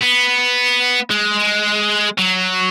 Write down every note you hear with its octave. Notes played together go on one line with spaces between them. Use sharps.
B3
G#3
F#3